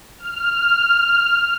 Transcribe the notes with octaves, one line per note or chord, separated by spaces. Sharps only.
F6